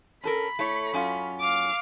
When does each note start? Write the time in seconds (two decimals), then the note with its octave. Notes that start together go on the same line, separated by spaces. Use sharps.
0.24 C#4 A4 A#4 B5
0.59 A3 E4 C#5
0.93 F#2 C#4 F4
1.40 F5 D6